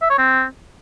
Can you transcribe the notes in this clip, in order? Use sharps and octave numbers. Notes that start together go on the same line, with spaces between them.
E5
C#5
C4